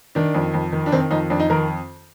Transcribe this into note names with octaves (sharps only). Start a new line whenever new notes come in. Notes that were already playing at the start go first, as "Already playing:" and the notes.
D#3 D4
F2
F2
D#3
D4
D#3 C4
F2 D#4
F2 D4
D#4
D#3 A#4